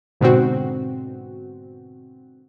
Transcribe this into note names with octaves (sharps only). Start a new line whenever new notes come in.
G#2 B2 D3 C4 F#4